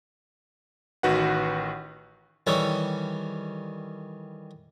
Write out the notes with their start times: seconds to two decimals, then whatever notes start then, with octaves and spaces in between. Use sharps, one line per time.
1.03 A1 D#3 F#4 B4 F#5
2.47 D#3 E3 G3 A4 C#5